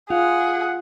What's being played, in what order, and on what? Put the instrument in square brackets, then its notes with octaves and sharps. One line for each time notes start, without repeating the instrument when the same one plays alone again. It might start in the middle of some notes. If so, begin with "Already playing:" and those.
[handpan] F4 [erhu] G#4 [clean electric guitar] F5 [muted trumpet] F#5